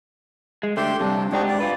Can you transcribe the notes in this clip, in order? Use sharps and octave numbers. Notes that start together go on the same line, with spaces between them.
G#3
D3 A3 G4 G5 C6
G2 C3 D4
G#2 C4 D4 D#4 F#4 G4
D5
F4 B4